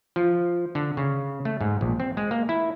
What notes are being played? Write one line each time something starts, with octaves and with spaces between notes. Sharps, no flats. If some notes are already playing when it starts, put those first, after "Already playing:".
F3
D3
C#3
A3
G#2
A#1
C4
G#3
A#3
E4